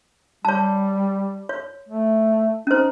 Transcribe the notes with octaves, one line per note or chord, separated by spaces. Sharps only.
G3 C#5 A5
C#5
A3
C#4 D#4 C5